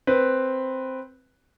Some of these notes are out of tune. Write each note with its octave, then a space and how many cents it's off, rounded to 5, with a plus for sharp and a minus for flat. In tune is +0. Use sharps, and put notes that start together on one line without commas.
C4 +0 B4 +0